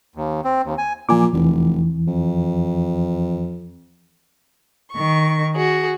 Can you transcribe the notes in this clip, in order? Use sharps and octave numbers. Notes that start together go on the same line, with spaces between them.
D#2
C4
D#2
G#5
A#2 F3 G#5 D6
F1 E2 E3
F2
D#3 C#6
F#4 G#4